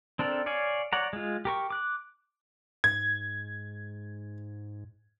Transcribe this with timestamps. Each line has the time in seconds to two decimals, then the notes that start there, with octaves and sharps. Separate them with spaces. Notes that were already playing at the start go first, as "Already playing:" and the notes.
0.19 C4 D4 A4 A#4
0.46 C#5 D5 F5 G#5
0.93 C#5 D5 F#5 A#5
1.13 G#3 F4
1.45 G4 A#4 C#6
1.70 D6 F#6
2.84 G#2 G#6